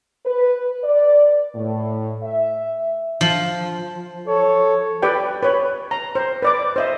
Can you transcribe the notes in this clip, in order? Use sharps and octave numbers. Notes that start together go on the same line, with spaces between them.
B4
D5
A2
E5
F3
A4 C#5
G4 B4 D5 G5
B4 C#5
A#5
C5
B4 D5 D6
C5 D#5 E5